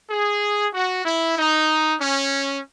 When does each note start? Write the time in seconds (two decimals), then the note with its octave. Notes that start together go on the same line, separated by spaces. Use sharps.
0.11 G#4
0.74 F#4
1.05 E4
1.38 D#4
2.01 C#4